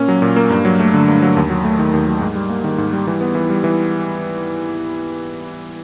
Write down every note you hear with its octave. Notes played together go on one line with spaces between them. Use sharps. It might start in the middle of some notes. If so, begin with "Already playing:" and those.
Already playing: A#2 A#3 C#4
F#3
A#2
A#3
G2
F#3
A3
D3
G2
F#3
D#2
F#3
A3
D#3
D#2
F#3
G#2
G3
A#3
D#3
G#2
G3
E3
B3
E3
G3
E3